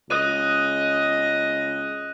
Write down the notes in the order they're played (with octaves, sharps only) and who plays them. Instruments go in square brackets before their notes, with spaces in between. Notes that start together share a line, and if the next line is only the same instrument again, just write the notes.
[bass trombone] C#2 [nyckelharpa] D#5 [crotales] D#6 F#6 D#7